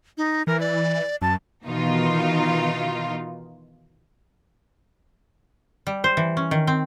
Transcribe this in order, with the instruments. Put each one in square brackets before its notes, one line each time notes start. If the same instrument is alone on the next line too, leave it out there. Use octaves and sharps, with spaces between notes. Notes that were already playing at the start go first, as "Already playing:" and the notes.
[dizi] D#4
[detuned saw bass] E3 [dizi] A#4
[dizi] D5
[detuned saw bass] F#2 [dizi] A5
[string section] B2 D#3 E3 D#4 F4
[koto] G3
C5
E3
C#4
D#3
C4